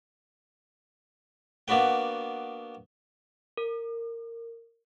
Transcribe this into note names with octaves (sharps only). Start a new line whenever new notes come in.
A#3 B3 D4 F#4 B4 G5
A#4